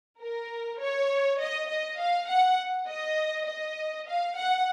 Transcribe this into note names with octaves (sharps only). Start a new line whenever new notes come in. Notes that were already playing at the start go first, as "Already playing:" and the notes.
A#4
C#5
D#5
D#5
F5
F#5
D#5
D#5
F5
F#5